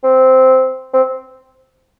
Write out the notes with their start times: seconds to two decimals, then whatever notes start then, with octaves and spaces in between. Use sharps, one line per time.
0.03 C4
0.94 C4